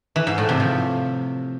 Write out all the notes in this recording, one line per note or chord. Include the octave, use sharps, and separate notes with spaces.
E3
G#2
A2
C3
F3